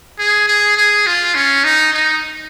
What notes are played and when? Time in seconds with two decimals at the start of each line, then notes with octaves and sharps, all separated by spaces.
0.18 G#4
0.48 G#4
0.77 G#4
1.07 F4
1.35 C#4
1.64 D#4
1.94 D#4